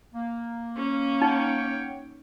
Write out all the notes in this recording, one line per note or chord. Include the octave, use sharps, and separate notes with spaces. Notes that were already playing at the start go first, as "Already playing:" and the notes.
A#3
C#4
D#4 C#5 F#5 G5